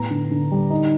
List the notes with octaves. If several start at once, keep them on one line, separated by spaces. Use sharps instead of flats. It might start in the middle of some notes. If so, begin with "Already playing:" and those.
Already playing: A2 B3 A#5
D3
D3
G3
D#4